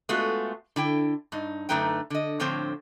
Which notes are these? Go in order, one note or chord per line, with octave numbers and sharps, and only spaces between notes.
G#3 A3 B3 F4 F#4
D3 E4 G5
G2 D#4
F#2 D3 A3 D#4 B4 G5
D3 D#5
A2 D3 F3 C4 C5 C#5